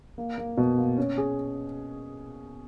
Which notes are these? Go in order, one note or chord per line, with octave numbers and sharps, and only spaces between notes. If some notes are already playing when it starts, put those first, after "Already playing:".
A#3
A#3
B2
A#3
C#4
G#4